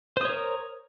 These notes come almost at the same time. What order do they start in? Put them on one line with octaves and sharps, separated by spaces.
C5 D#6 C#5 A#4